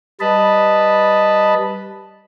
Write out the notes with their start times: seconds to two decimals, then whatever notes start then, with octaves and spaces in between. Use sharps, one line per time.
0.20 G3 B4 D#5 A5 B5